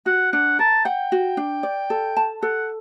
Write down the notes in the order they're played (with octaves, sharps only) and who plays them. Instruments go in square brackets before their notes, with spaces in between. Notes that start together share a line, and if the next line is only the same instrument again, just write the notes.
[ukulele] F#4 [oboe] F#5
[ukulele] D4 [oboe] F#5
[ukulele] A#4 [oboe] A5
[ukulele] F#5 [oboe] G5
[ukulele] F#4
D4
D5
A4
A5
[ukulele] A4 [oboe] F#5